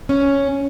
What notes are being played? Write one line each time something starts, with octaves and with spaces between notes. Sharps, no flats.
C#4